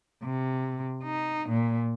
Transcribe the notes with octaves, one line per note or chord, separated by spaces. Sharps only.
C3
D#4
A#2